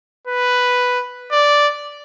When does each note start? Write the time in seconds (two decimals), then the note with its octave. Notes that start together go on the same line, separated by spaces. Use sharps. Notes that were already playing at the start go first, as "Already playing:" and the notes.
0.28 B4
1.32 D5